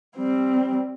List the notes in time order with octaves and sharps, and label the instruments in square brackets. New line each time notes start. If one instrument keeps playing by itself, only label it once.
[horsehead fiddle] G3 C4